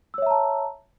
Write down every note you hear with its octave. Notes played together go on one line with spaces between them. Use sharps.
C#5 E5 A5 A#5 E6